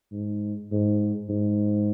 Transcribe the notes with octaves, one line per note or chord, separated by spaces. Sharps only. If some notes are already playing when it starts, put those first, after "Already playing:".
G#2
G#2
G#2